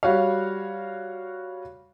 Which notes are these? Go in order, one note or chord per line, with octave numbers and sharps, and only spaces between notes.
G3 F#4 C#5 F5